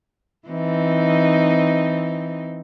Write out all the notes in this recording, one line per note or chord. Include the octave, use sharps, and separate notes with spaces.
E3 C4 D#4